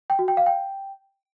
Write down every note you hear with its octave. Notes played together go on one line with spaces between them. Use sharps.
G5
F#4
G5
F5
G5